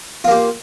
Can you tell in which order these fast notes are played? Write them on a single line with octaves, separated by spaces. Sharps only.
F4 A#3 G4